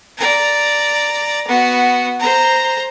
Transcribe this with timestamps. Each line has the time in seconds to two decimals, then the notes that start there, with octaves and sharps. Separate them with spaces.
0.18 D5 A#5
1.47 B3 F#4
2.20 C5 A#5